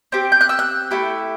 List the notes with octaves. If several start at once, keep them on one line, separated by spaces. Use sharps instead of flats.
C4 G4
G6
F#6
E6
F#6
A3 E4 G4